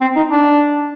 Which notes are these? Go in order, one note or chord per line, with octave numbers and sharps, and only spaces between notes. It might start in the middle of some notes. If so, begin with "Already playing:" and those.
C4
D#4
D4